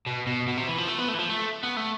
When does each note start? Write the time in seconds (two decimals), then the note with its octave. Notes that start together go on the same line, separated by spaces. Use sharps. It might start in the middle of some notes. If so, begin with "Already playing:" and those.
0.07 B2
0.27 B2
0.47 B2
0.57 C3
0.68 E3
0.78 F3
0.88 A3
0.98 B3
1.09 A3
1.15 E3
1.19 F3
1.29 A3
1.63 B3
1.77 A3